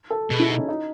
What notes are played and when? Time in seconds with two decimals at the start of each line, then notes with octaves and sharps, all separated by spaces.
0.10 A4
0.30 B2 G#4
0.39 E4
0.50 D#4
0.59 C#4
0.68 D#4